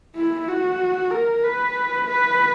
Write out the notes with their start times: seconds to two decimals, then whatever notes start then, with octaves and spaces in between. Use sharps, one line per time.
0.15 E4
0.48 F#4
1.11 A#4
1.43 B4
2.08 B4